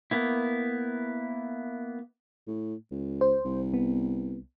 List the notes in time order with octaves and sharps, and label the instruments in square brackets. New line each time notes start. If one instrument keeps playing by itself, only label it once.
[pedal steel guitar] A#3 B3 E4
[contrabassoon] A2
C#2
[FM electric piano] C5
[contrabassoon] C2
[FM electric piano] B3